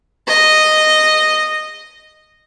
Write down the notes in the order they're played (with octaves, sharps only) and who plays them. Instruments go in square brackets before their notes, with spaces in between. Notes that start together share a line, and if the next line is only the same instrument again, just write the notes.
[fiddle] D#5